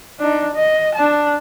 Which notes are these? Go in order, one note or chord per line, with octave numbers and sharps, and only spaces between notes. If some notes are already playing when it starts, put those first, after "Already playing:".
D4 D#4
D#5
D4 A5